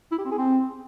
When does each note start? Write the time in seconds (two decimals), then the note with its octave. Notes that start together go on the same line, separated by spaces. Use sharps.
0.12 E4
0.18 G4
0.25 C4
0.31 G#4
0.38 C4